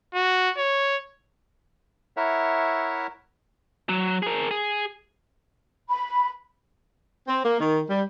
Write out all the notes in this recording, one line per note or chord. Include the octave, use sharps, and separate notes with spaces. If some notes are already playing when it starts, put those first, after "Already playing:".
F#4
C#5
E4 A#4 C#5 E5 F#5
F#3
G#4 A#4
G#4
B5
C4
A#3
D#3
G3